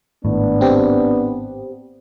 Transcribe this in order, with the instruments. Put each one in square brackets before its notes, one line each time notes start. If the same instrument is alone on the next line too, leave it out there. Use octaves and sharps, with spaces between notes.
[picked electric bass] G#1 A2 [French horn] B3 [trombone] D4
[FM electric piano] C4 G4